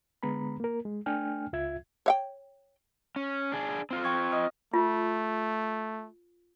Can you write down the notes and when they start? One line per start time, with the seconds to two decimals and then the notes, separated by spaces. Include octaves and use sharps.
0.23 D3 G#3 B3 A#5 B5
0.60 A#3 A#4
0.85 G#3
1.06 A3 D4 G5 G#5 F6
1.53 C#2 F4 E5 G#6
2.06 C#5 F5 G5
3.16 C#4
3.52 D4 G#4
3.91 C4 F4
4.04 G5 C#6 G#6
4.32 D#5 D#6 F6
4.74 A3 F4